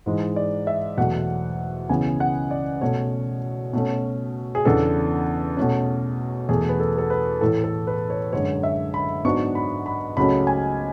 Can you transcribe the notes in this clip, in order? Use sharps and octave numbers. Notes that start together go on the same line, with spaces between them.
G#2 E3 G#3
D5
E5
E2 B2 F#3 A3 F#5
C#2 C#3 E3 B3 G#5
F#5
D5
B2 A3 C#4 C#5
B2 A3 C#4
G#4
E2 C#3 E3 B3 D4 A4
B2 A3 C#4
E2 B2 F#3 A3 G#4
B4
A4
A4
B4
A2 E3 A3 A4
A4
B4
C#5
F#2 D3 G#3 C#5
E5
B5
G#2 F#3 B3 D4 C#6
B5
B5
C#2 C#3 F#3 A3 C#4 B5
G#5